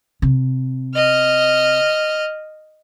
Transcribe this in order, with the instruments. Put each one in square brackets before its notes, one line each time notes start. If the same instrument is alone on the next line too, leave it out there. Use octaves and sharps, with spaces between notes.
[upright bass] C3
[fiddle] D#5 F6